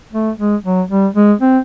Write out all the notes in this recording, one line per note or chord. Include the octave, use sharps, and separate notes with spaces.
A3
G#3
F#3
G3
G#3
C4